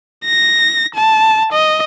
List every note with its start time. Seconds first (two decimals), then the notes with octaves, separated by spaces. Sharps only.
0.25 A#6
0.95 A5
1.53 D#5